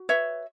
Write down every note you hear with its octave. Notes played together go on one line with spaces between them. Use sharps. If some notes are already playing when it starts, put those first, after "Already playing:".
Already playing: F#4
B4 C#5 E5